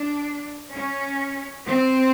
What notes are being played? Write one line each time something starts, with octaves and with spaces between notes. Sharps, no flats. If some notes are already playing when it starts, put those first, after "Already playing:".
Already playing: D4
C#4
C4